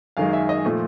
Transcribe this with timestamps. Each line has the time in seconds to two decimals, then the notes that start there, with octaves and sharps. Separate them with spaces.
0.17 F#2 D#3 G#3 F5
0.33 E5
0.49 D#5
0.65 A#2 F3 A3